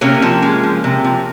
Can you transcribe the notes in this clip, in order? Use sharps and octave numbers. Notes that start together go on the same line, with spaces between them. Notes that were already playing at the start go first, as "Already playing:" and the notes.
C3 A#3 C#4
F3
G#3
F3
C3
F3